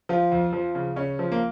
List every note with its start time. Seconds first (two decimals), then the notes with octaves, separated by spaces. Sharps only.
0.09 F3 F4
0.32 F2
0.53 F3
0.75 C#3
0.96 C#3 C#4
1.19 F3
1.32 A#3